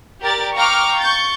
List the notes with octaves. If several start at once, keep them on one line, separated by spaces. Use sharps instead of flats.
G4 A#4 D5 A6
F5 G5 A#5 C#6 D6 F6
C#6 G6 A6